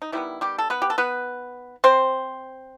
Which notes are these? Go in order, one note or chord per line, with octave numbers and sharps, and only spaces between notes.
D#4
D#3 E3 G3 B3 E4
G3 G4
A4
B3 B4
G4
A4
B3 B4
C4 C5